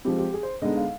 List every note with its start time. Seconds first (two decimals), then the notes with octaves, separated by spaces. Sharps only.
0.05 F3 G#3 C4 G4
0.18 G4
0.34 G#4
0.43 C5
0.62 D3 G#3 B3 D#4 D#5
0.76 F5